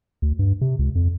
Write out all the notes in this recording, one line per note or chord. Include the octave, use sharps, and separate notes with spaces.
D2
G2
C3
C#2
F2